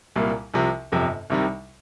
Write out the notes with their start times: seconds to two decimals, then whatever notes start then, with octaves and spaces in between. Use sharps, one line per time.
0.16 C2 A#2 G3 A#3
0.54 C2 C3 F3
0.92 G1 F2 C3
1.30 C2 C3 D#3 G3